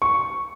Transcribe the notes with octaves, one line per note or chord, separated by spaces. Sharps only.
C#6